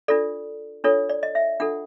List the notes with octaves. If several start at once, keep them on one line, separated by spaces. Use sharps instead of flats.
D4 F4 A4 D5
D4 F4 A4 C#5
D5
D#5
E5
D4 F4 A4 F#5